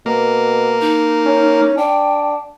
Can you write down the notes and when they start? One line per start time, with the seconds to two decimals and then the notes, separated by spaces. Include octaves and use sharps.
0.06 B2 A#3
0.81 D#4
1.25 C#4
1.77 D4 G5